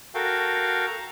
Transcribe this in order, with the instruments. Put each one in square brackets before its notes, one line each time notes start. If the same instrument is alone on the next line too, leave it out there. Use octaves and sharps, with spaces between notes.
[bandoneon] F#4 A4 A#4 F5 G5
A#5